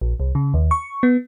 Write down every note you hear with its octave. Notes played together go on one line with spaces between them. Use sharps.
A#1
C2
C#3
D#2
C#6
B3